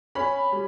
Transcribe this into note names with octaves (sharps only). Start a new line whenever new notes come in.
C#4 B5
G3